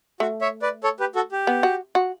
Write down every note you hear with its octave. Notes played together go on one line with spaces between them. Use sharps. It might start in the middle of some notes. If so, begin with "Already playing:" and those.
A3 F#4
C#5 E5
B4 D5
A4 C#5
G4 B4
F#4 A4
G4
B3
F#4
F#4